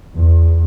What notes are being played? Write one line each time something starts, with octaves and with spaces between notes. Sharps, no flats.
E2